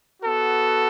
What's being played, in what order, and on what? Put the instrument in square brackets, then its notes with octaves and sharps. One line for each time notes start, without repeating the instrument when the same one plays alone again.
[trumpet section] B3 F#4 A4